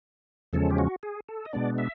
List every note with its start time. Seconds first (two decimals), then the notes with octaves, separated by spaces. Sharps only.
0.53 E2 C#3 F3 G#3 C#4 A4
0.71 G4
0.78 F#4
1.03 G#4
1.29 A4
1.45 D#5
1.53 B2 G#3 B3 D4 D5
1.78 E5